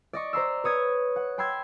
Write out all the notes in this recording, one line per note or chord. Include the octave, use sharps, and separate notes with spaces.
D5 D#5 C#6
C5 A#5 C6 E6
B4 C#5 D#6 G#6
F#5
G5 B5 C6 E6 G#6